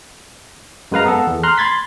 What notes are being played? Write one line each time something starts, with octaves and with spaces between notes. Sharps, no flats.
F#2 G#3 B4 F5 A#5
B3 A4
E2
A#5 C6 F6 F#6
B5 C6 G#6 A6 B6